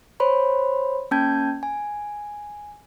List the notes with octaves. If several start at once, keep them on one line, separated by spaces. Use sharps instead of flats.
C5 C#5 B5 C6
A#3 C#4 G5 A5 G6 G#6
G#5